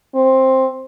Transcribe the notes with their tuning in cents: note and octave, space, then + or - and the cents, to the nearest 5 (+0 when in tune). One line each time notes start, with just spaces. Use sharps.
C4 +10